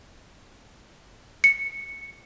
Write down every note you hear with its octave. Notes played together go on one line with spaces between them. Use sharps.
C#7